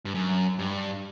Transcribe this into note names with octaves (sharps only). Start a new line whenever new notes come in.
G2
F#2
G2